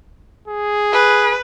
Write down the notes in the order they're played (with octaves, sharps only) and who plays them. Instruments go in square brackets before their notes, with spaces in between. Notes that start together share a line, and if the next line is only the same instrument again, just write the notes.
[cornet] G#4
[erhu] B4